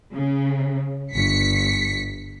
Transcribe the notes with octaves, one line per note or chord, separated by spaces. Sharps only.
C#3
G1 B6 C#7